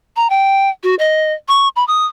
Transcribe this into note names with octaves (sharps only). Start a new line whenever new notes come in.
A#5
G5
F#4
D#5
C#6
B5
D#6